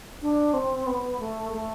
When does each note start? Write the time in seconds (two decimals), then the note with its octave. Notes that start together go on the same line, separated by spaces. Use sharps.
0.22 D4
0.54 C4
0.87 B3
1.20 A3
1.53 A3